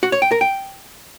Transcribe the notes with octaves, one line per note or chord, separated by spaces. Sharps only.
F#4
C#5
G5
A#4
G5